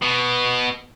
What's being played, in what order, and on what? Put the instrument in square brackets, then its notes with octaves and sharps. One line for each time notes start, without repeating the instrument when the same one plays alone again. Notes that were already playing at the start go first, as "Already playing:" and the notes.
[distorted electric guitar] B2